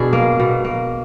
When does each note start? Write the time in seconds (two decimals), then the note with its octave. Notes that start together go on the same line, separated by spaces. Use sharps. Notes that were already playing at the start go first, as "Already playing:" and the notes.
Already playing: B2 D4 G#4
0.13 A#3
0.40 B2
0.65 A#3